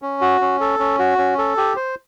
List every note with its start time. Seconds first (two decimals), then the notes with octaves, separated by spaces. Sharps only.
0.02 C#4
0.21 F#4
0.41 C#4
0.61 A4
0.79 C#4
0.99 F#4
1.18 C#4
1.38 A4
1.57 G4
1.76 C5